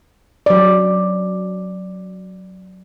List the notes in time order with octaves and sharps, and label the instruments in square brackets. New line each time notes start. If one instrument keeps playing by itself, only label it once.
[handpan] F#3 D5